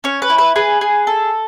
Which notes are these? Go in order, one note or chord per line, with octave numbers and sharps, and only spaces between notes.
C#4 C#5
B4
E4
B4
G#4 B4
G#4
A4